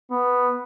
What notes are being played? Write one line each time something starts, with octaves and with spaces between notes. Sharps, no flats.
B3